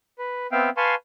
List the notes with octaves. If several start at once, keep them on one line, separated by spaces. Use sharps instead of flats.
B4
B3 C4 E5 F5 G5
B4 F5 G#5 A5 C6 C#6